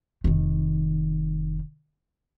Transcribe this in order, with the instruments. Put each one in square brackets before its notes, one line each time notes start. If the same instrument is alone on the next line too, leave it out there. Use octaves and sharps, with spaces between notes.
[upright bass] F1 D#3